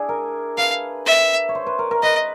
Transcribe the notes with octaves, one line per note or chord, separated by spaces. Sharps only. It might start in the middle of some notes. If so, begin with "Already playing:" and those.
Already playing: D4 E4 G#4
A#4
B4 F5
E5
C#5
C5
B4
A#4
A#4
B4 D#5